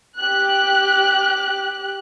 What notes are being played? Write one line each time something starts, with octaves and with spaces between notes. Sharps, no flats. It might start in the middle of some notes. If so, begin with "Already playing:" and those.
G4 F#6